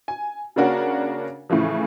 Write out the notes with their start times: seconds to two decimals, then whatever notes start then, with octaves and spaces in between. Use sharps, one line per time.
0.08 G#5
0.56 C#3 A#3 D4 F#4 A#4 C#5
1.50 A2 C#3 E3 F3